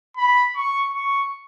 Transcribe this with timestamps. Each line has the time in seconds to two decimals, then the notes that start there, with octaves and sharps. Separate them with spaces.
0.17 B5
0.56 C#6
0.94 C#6